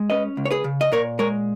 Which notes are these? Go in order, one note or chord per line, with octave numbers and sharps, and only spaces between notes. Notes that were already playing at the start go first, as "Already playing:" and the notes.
Already playing: G#3
C#4 B4 D#5
C#2
C#5
G#4 B4
C#3
D#5
A#2 A#4 C#5
G#3 A#4 C#5